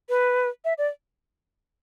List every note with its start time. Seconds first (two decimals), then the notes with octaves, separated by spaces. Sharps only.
0.09 B4
0.65 E5
0.78 D5